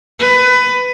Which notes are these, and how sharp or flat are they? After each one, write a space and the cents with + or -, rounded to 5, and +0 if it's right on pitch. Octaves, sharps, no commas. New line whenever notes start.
B4 +20